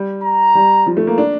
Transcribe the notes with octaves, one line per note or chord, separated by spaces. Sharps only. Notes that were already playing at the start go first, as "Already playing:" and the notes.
Already playing: G3
A#5
G3
F3
A3
A#3
D4